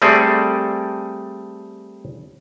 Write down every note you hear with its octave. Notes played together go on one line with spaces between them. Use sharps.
G3 A3 C4 G#4 A4 D5